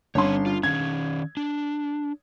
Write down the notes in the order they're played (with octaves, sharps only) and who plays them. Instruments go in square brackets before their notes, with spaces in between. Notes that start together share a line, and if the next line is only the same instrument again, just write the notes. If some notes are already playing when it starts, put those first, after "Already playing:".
[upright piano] G1 C#4 C6 [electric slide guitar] C4 C#5
[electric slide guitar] F4
[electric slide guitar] D#3 C#4 [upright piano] G#6
[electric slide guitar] D4